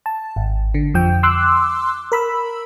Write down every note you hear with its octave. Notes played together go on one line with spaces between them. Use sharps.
A5
G#1
D3
F2 F3 G5
C6 D6 E6 F#6
A#4 B5 E6